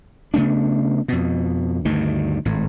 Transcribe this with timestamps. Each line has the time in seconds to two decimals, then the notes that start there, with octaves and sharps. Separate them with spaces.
0.34 C#3 A3 B3 D4
1.08 F2 B2
1.85 D2 G2 D#3
2.45 G#1 A2